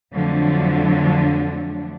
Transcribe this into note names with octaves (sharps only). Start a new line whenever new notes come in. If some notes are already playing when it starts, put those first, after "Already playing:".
F2 D3 F3 F#3 A3 D4